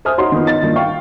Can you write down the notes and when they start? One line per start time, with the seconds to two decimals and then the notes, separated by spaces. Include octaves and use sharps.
0.05 C5 E5 G#5 D#6 F6
0.18 D#4 F#4 C#5 A#5 C6
0.32 D#3 F3 B3
0.45 D#4 A6
0.63 G2 A#2 D#3 F#3
0.76 F5 G5 C#6